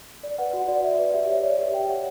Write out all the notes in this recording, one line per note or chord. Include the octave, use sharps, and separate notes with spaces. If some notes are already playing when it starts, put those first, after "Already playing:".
D5
B4 F#5
F#4 F#5
F#4 D5
D5 E5
B4 D5
G4 E5
C#5 E5
C#5 D5
G4 E5
G4 G5
C#5 F#5